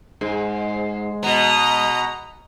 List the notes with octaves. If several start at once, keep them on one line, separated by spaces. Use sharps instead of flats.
G#2 G#3
B2 B3 D#5 A#5